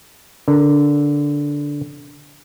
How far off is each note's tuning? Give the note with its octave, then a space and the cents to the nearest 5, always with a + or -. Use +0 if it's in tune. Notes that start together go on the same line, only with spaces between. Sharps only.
D3 -10 A#4 +5